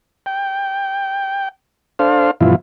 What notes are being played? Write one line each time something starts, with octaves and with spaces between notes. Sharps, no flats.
G5
D4 A4 C5 F5
G2 B2 E3 F3 E4 F4